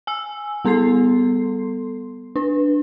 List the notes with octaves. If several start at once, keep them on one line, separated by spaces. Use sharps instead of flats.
G#5 E6
G3 B3 A4 C6 C7
D4 B4